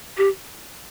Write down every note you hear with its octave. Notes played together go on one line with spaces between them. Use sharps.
G4